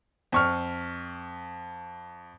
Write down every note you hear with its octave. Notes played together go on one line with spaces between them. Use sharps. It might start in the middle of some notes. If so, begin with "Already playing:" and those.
F2 C#6 F6